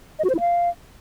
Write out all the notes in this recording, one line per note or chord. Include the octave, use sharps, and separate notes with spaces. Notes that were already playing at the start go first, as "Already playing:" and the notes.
D#5
F#4
C5
E4
F5